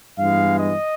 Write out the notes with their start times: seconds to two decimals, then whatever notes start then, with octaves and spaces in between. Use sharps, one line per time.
0.19 G2 E3 G#3 B3 F5
0.58 D#5